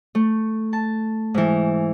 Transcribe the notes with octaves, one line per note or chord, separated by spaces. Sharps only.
A3
A5
G#2 E3